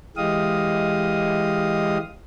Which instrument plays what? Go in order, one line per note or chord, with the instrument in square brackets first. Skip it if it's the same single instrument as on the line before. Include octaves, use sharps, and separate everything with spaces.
[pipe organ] E3 G#3 G4 D#5 F5 D#6